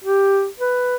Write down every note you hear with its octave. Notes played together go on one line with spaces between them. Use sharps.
G4
B4